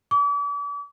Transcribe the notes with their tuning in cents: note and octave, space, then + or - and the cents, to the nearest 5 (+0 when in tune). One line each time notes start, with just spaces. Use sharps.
D6 -40